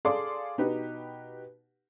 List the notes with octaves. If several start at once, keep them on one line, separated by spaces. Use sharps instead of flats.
G#4 A4 D5 F5 C6 D6
B2 D#4 G4 B4